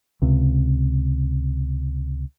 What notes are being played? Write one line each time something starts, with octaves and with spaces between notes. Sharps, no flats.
C#2 C3